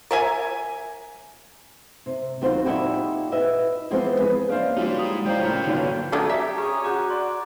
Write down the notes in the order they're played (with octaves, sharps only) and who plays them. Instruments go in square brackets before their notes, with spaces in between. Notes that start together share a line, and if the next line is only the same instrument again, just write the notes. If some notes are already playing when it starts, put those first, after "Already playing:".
[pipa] A#4 E5 G#5
[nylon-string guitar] C3
D#2 F#3 C4 F4 F#4 C5
A#2 D#4 E4 F#4 G4 A4
E4 B4 D#5 E5
E3 F3 G#3 B3 C4
G#4 B4
[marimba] F3 A#3 D4 [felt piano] C#4 C5 D5 [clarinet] F5
[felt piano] G3 [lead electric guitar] G#3 D#4 [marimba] F4 F#4 C#5
[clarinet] E4 [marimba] G#4 D#6
[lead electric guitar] G3 F5 [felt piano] D4 [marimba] C5 C#5 A#5 [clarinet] G5
[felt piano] A2 C#3 [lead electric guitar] F4 A#4
[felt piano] G1 A#2 F#3 [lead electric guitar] D3 [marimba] D#4 C#5
[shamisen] F#3 A3 D4 [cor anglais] G#4 [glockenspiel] A#5 D6 G#6
[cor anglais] G4 [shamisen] E5
[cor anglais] C#4 [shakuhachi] G#4 [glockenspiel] A#5
[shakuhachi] F#4 [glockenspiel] A#5 D6 G6
[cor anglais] D5 [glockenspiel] C6